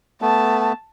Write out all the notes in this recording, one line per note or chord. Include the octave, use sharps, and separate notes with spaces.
A3 B3 A5